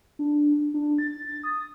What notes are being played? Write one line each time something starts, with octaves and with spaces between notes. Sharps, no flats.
D4
D4
A6
D#6